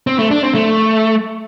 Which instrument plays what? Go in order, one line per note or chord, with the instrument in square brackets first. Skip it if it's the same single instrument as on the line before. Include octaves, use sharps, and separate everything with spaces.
[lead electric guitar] C4
A3
D4
C4
A3